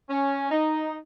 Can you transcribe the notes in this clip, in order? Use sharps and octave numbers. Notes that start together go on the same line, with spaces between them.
C#4
D#4